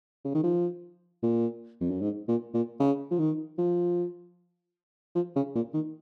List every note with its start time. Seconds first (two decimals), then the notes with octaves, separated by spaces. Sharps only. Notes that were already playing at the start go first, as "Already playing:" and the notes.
0.24 C#3
0.35 D#3
0.44 F3
1.23 A#2
1.81 F2
1.91 F#2
2.01 G#2
2.28 A#2
2.54 A#2
2.80 C#3
3.11 F3
3.19 D#3
3.58 F3
5.15 F3
5.36 C#3
5.55 A#2
5.74 D#3